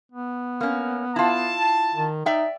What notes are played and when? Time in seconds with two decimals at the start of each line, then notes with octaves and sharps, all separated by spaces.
0.12 B3
0.61 A#3 C#4
1.16 E4 F4 A5
1.94 D#3
2.26 D#4 D5 E5 G5